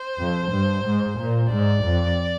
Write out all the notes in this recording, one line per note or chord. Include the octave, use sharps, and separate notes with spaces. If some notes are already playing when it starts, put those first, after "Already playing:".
Already playing: C5
F2
G2
G#2
A#2
G#2 D5
F2